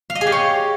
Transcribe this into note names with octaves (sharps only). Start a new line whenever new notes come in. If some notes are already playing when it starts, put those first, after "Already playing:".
F5
D#5
G#4
G4
C#5